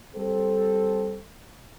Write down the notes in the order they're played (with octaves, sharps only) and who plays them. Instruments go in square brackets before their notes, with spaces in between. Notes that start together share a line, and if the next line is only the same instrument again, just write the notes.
[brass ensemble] G3 C4 A4